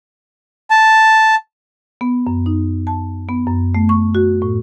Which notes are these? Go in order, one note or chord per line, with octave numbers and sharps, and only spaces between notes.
A5
B3
F#2
D#4
A5
B3
F#2
A3
C#6
F#4
A2